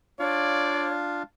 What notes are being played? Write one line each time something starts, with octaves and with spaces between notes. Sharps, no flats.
D4 F4 C#5 D5 F5